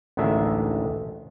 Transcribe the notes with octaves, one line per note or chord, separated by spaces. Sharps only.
A1 D2 D#3 G#3 D4 E5